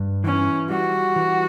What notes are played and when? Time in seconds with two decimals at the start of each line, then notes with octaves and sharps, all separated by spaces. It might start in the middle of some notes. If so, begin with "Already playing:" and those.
Already playing: G2
0.24 E3 C#4
0.70 G3 F#4
1.16 E3